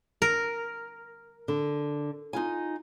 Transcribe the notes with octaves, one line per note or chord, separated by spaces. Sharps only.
A#4
D3
D#4 F4 G#5